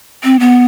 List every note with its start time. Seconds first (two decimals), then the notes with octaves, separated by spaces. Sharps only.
0.24 C4
0.40 B3